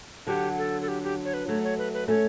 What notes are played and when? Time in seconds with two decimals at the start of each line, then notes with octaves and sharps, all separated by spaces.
0.27 D3 F#3 G4
0.58 A4
0.81 A4
0.88 G4
1.03 G4
1.25 C#5
1.34 B4
1.48 F#3 A3 C#5
1.64 C#5
1.78 B4
1.94 B4
2.08 A3 C#4 C#5